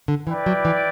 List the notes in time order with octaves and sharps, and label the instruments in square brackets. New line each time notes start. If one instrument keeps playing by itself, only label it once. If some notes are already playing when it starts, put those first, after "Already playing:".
[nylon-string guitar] D3
[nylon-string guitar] E3 [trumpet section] E4 B4 D5 G5
[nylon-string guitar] F#3
E3